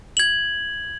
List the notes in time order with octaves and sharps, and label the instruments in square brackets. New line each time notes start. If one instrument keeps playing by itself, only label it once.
[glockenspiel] G#6 F#7